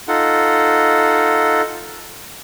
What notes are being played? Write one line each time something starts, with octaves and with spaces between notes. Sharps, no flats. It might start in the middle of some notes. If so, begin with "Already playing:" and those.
D#4 F4 A4 F#5